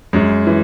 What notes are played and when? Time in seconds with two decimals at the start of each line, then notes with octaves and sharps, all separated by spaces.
0.13 F#2 G#3
0.47 E3